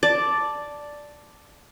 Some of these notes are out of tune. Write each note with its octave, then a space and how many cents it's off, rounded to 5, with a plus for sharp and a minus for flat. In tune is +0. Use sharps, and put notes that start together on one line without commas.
D5 +0 A5 +0